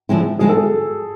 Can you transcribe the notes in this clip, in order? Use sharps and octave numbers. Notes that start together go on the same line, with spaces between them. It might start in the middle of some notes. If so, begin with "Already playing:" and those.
D3 F3 G#3 C4 E4
D3 F3 G#3 C4 E4 G#4
A4
G#4